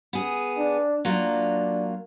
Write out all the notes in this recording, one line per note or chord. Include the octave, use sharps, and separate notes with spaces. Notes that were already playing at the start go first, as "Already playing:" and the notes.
B3 G#4
D4
F#3 A#3 D4 F4